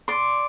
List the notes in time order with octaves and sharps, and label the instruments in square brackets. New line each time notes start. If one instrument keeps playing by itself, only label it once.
[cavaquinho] D5 C6